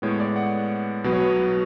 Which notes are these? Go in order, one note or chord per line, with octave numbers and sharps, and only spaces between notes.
A2 G#3 B3 C#5
D5
F#5
B2 F#3 B3 B4
C#5
B4